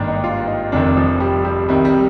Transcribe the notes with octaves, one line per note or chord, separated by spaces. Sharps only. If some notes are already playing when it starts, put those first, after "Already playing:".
Already playing: G#1 G2 D#3 A#3 D4
D#4
F4
D#4
F1 F2 C3 D#3 D4
F3
G3
G3
C2 C3 D#3 G3
G3